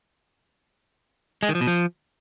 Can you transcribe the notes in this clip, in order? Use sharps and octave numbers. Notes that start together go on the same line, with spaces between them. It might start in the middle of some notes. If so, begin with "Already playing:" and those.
G#3
D#3
F3
B2
F3